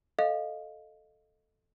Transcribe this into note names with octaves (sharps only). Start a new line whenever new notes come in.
A4 D#5 F5